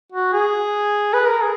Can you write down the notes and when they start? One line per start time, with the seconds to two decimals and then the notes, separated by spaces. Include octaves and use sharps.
0.12 F#4
0.33 G#4
1.14 B4
1.28 A#4
1.41 G#4